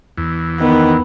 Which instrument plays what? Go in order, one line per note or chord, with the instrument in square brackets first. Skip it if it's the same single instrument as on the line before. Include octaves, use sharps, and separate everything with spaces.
[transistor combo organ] E2
[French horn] D#3 [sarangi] B3